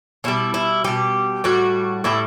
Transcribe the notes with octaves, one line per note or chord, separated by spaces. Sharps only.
B2 G3 E4
E4
B2 G3 G4
A2 G3 F#4
A2 G3 E4